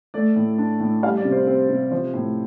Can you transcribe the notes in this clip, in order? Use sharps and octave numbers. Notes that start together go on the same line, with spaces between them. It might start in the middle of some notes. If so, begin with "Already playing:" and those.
A3 D5
A2
D4
A2
G3 F5
D5
C3
C5
C4
C3
F3 C5
A2